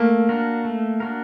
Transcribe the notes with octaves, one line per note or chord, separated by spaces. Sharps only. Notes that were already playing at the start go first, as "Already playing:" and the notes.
Already playing: A3 A#3
D4 F#4 A#4
A3
D4 F#4 A#4